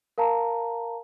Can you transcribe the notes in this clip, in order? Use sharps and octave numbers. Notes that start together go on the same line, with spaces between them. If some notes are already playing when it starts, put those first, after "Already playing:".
A#4 F5 A5 A#5